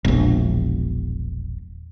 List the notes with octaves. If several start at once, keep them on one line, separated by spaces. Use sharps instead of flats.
E1 A#1